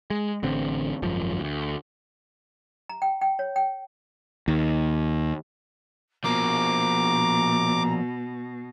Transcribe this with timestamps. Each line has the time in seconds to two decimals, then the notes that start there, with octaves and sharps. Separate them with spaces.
0.10 G#3
0.43 A1 D3 C4
1.02 G#1 F#2 F3
1.39 D2
2.89 A#5
3.02 G5
3.21 G5
3.39 C#5
3.56 G5
4.48 D#2
6.24 B2 F3 A#3 A#5 D6